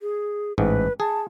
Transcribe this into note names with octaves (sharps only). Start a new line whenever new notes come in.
G#4
A1 G#2 B4
G#4 A5